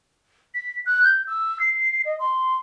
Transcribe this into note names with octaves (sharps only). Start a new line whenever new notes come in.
B6
F#6
G6
E6
C7
D#5
C6